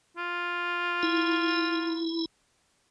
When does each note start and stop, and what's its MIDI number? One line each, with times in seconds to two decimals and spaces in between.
0.17 2.15 65
1.03 2.25 64